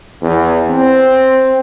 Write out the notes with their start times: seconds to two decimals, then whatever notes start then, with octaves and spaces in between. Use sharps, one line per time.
0.22 E2
0.70 C4